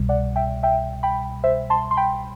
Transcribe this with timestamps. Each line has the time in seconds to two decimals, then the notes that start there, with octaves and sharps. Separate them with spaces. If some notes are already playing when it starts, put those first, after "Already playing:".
Already playing: C2 B2 G3
0.09 D5 F#5
0.36 E5 G5
0.63 E5 G5
1.03 G5 B5
1.44 C5 E5
1.70 A5 C6
1.91 C6
1.97 G5 B5